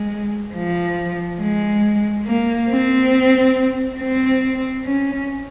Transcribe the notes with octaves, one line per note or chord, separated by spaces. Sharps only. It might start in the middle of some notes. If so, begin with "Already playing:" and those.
Already playing: G#3
F3
G#3
A#3
C4
C4
C#4